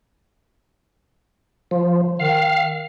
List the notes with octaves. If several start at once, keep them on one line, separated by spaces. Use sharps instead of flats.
F3
D#3 F5